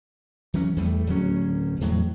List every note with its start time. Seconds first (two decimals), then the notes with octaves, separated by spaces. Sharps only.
0.54 E3 F#3 C#4
0.76 E2 G3 A3
1.07 D1 D#2 F#3 C#4
1.81 E2 A2 F#3